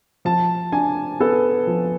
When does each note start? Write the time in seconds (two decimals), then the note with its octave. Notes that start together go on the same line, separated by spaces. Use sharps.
0.25 F3 A5
0.72 D4 G#5
1.20 B3 A4
1.67 F3